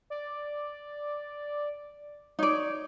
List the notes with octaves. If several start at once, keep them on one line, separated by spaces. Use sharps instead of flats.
D5
D#4 C#5 D5